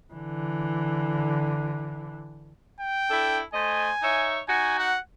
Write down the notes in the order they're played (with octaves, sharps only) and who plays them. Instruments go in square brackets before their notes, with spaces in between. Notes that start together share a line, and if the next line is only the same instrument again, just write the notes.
[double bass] D3 E3
[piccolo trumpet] G5
[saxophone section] D4 E4 A4
[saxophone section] A3 C5 D#5 [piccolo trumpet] G#5
[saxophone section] D#4 C#5 E5
[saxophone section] D#4 F#4 [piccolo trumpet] G#5
[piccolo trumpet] F#5